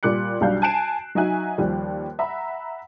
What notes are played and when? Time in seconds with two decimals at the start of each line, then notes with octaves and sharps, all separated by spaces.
0.03 A#2 G3 D6 F#6 C#7
0.41 B1 G3 D4 F#4 F5 G6
0.62 G#5 A5 F#6 C7 D7 E7
1.15 F#3 D#4 F#4 E5 G#5 F#6
1.58 D#2 F3 G3
2.19 E5 F#5 A#5 B5